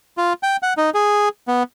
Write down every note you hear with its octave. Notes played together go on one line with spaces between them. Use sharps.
F4
G5
F#5
D#4
G#4
B3